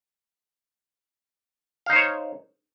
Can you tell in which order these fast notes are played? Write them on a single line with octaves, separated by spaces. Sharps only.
F5 D#4 C5 C#5